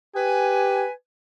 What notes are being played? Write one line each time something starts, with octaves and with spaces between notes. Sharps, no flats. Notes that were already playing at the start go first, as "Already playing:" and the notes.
G4 B4 G#5